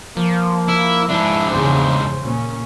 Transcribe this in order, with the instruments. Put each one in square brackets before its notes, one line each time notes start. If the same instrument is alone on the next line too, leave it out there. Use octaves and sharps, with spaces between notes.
[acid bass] F3 [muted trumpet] A#3
[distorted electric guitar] E4
[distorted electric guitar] G#2 D4 [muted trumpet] E4
[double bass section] E2 C#3 E3 [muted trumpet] C5
[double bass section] A#2 C#4